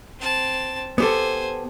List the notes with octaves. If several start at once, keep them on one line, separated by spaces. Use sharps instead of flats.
C4 A5
B3 G4 A4 C5 G#5